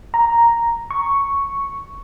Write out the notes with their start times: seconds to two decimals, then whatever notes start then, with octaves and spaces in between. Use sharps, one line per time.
0.14 A#5
0.91 C#6